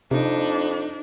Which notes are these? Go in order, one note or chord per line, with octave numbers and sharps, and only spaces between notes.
F2 C3 D4 D#4